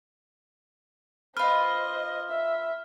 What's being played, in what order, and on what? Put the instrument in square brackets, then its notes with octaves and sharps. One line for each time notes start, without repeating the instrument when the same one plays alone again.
[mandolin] F4 B4 [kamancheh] C5 D#5 [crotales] F6
[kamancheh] E5